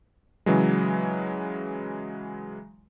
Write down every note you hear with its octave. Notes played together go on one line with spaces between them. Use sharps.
C#3 E3 F#3 G#3